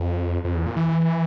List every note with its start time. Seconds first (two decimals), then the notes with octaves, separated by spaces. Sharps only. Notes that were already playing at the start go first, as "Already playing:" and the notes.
Already playing: F2
0.45 F2
0.55 E2
0.66 A#2
0.76 E3